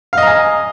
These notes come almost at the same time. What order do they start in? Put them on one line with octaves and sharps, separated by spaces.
F5 D#5 A#5 G#5